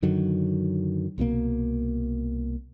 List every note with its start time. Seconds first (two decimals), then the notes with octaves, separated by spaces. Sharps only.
0.02 F#2 D3 D#3 F#3
1.18 C2 B2 F3 A#3